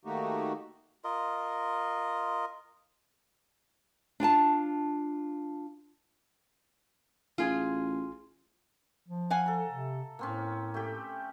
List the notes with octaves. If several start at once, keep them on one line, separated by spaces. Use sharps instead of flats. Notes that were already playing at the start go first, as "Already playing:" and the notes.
D#3 A3 A#3 D#4 F#4 G4
F4 A#4 D#5
D4 F4 G#5 A5
A1 F4 G#4
F3
F5 F#5 G#5
A4 A#5
C3
A2 A#3 C4 C#4
A3 G4